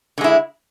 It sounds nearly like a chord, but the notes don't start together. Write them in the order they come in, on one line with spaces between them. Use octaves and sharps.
D3 G#3 E4